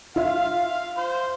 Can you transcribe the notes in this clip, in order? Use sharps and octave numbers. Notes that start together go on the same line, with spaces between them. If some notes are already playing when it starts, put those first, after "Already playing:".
F4 E5 F5
C5